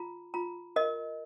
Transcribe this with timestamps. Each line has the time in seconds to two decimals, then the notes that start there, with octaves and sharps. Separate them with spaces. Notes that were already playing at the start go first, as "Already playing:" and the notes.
Already playing: F4 A#5
0.34 F4 A#5
0.76 A#4 D#5